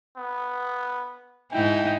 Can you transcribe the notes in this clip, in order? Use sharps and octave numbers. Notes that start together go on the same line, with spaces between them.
B3
G#2 D#4 E4 G5